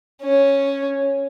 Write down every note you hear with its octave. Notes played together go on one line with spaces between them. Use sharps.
C#4